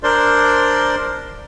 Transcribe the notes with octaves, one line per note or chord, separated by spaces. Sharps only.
D4 A#4 C5 D5 C6